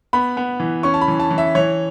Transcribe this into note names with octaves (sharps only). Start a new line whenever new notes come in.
B3 B5
B3
E3
C#4 C#6
A5
B5
E3
A5
E3
E5
E3 C#5